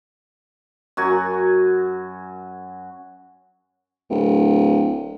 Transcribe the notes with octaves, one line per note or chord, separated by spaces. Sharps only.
F#2 F#4 G#5
D1